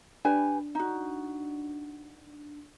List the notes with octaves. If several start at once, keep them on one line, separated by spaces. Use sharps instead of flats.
D4 G4 B4 G#5
D#4 F#4